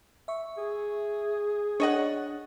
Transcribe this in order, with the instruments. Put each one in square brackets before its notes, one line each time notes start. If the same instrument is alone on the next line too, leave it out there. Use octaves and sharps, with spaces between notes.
[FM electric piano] E5 C#6
[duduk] G#4
[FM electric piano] D4 [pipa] C#5 D#5 F#5